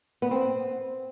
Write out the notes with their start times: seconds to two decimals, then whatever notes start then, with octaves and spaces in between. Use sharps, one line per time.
0.22 B3
0.31 C4